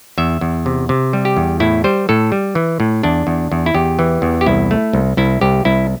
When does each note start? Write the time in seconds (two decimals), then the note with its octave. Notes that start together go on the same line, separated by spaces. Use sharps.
0.18 E2 E5
0.41 E2
0.66 C3
0.89 C3
1.13 G3
1.25 G4
1.37 E2
1.60 A2 E4
1.84 G3 C5
2.09 A2 A4
2.32 G3
2.55 E3
2.80 A2
3.03 E2 D4
3.27 E2
3.52 E2
3.66 E4
3.74 E2 G4
3.99 E3
4.22 E2
4.41 G4
4.46 C2 E4
4.71 A3
4.93 C2
5.17 C2 E4
5.41 C2 G4
5.65 C2 E4